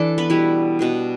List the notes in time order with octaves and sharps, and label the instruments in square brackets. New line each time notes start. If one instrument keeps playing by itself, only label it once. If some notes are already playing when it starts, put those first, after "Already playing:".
Already playing: [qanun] E3 D4 E4 A4 D5 A5
B3 B4
B2 G3 E4
B2 B3 D4